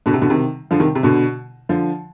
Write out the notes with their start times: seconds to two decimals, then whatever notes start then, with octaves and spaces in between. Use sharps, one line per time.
0.06 B2 D3
0.13 C3
0.22 B2 D3
0.30 C3 D#3
0.71 D3 F3
0.80 C3 D#3
0.95 C3
1.03 B2 D3
1.69 D3 F3